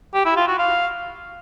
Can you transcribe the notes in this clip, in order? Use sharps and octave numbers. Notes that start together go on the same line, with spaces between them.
G4
E4
F4
F#4
F5